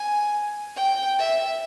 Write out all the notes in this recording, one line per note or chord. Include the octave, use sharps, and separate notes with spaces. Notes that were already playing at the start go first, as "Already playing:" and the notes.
Already playing: G#5
G5
E5